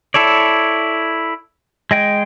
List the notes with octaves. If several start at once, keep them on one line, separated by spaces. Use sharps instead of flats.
E4 A4 C#5 D5
G#3 D#5 G5